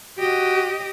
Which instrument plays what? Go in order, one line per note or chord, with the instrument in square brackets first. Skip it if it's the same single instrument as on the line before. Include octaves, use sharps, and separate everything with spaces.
[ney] F#4 [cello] G4 D#5